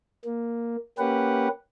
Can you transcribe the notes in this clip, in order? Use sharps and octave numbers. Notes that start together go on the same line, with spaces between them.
A#3
A#3 C#4 G4 B4 F#5